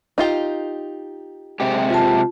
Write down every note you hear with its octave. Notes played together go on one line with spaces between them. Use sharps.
D#4 F4 G4
C3 G#3 G4
F4 A5